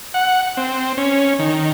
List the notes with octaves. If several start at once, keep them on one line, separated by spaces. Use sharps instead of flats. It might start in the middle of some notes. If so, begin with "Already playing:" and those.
F#5
C4
C#4
D#3